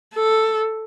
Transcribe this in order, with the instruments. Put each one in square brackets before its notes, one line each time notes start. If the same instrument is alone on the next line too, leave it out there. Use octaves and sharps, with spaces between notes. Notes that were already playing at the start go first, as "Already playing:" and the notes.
[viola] A4